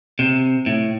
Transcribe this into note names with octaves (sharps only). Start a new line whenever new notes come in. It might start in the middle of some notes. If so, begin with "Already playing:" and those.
C3
A2